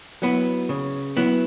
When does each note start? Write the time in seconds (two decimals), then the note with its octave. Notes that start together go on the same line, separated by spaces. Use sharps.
0.22 F#3 B3 E4
0.69 C#3
1.17 F#3 B3 E4